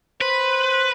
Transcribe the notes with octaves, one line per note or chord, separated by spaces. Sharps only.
B4 C5